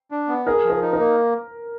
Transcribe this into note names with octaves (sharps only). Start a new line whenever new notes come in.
D4
B3
G#4 A#4
F3
A#4
D#4
A#4
A#3